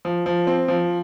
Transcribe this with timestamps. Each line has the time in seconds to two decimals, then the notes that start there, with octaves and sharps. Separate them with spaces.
0.05 F3
0.26 F3
0.47 C4
0.68 F3